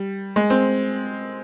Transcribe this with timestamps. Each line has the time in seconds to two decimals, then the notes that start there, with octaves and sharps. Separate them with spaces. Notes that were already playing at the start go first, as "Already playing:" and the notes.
Already playing: G3
0.36 G#3
0.50 C4